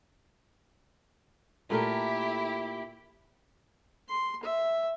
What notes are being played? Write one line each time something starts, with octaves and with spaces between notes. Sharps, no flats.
A#2 A3 E4 G4 A#4
C6
E5